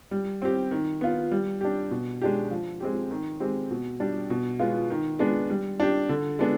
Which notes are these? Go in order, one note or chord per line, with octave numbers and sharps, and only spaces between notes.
G3
C4 G4
D#3
B3 F4
G3
D4 G4
B2
G#3 D4 G4
F3
G#3 C4 G4
D#3
G#3 C4 G4
B2
G3 D4 G4
B2
G#3 B3 F4
D#3
G#3 B3 D4
G3
D4 G4
D3
G#3 B3 D4